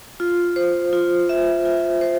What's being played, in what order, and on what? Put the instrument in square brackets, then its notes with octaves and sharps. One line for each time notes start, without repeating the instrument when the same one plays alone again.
[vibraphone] F4
C5
F4
E5
F4
C5